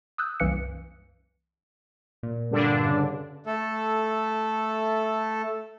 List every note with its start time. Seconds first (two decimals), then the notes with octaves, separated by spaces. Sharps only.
0.18 D#6 E6 F#6 G6
0.40 C2 F#2 E3 A#3 F#6 C#7
2.23 A#2
2.51 G2 D3 D4
2.88 C#3
3.46 A3 A4